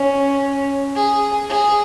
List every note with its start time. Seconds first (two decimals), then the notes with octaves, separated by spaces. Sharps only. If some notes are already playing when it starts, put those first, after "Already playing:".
Already playing: C#4
0.96 G#4
1.50 G#4